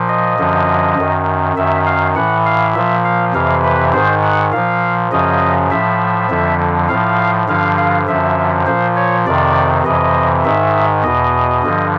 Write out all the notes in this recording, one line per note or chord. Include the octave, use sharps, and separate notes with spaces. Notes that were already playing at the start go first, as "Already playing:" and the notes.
Already playing: A#2 F3
D#5
F#2 D3 F3
F#2 D#3
F#2 D#3 E5
F5
A2 E3 F#5
F5
A#2 F3 E5
F5
F2 C3 E3 F5
B4
G#2 D#3 C5
F#5
A#2 F3 F5
F#2 C#3 F3 D#5
A2 F3 E5
F2 D3 F3
A2 F3 F5
G2 D3 F3 F5
F5
F#2 D3 F3 E5
A#2 F3 C5
C#5
F2 C3 D#3 D5
F2 C3 E3 D#5
G#2 D#3 E5
E2 B2 D#5
G2 D3 F3